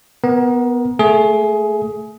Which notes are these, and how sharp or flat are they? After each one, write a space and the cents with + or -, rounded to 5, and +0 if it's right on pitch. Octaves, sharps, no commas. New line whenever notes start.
B3 +0 A#4 +25
A3 +0 G#4 +20